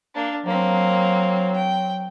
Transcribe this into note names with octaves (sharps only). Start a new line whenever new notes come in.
A#3 D4
F#3 A#3 C4
G5